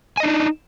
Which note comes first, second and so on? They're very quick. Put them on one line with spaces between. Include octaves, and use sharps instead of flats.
G#5 D#5 D4 D#4